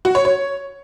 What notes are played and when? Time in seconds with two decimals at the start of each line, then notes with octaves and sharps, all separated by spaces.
0.05 F#4
0.15 C#5
0.25 C#5